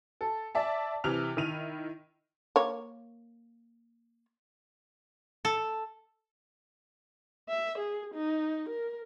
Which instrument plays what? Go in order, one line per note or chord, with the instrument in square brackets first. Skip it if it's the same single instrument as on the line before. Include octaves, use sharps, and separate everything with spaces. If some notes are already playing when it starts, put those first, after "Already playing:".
[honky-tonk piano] A4
D5 E5 A5
C3 E3 F6 F7
D#3 E4 D#7 F7
[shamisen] A#3 C#5
[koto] A4
[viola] E5
G#4
D#4
A#4